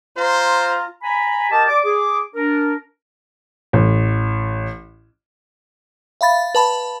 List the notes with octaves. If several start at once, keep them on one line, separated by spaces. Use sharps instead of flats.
F4 C5 A#5
G#5 A#5 B5
G4 A#4 D#5 G5 A5
D5 D6
G#4 D6
D4 A#4
A1
E5 F5 B5 A6
B4 A5 B5